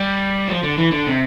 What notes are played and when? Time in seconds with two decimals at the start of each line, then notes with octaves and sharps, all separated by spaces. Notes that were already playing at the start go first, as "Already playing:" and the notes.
Already playing: G3
0.48 F3
0.63 D3
0.78 E3
0.92 D3
1.07 C3